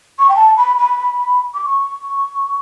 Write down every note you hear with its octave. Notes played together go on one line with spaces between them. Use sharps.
C#6
G5
A5
B5
B5
D6
C#6